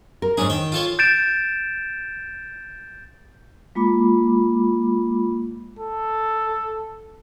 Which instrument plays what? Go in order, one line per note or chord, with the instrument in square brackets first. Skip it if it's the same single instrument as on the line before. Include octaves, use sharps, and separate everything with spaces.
[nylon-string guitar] A#4
[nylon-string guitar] G#2 B2 D4 [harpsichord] C#4 G#4
[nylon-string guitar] D#3 [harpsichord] G5
[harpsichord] F4 A4 C#5
[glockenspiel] G6 A6 D7 E7
[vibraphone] G#3 A#3 F4 B5 D6
[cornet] A4